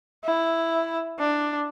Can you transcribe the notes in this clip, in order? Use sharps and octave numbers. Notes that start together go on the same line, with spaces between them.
E4
D4